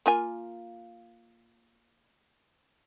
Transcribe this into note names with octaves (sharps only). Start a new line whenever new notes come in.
A#3 F4 G#5